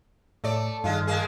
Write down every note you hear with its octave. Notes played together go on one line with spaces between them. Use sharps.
A2 A3 C#5 D5 E6
G2 D#3 G#3 F4
G#3 A#3 G#4